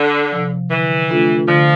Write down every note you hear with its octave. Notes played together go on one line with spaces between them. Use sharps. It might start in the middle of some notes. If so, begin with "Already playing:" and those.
Already playing: D3
C3 F3
D3 E3
A3 D4 F4 A4
D3 F3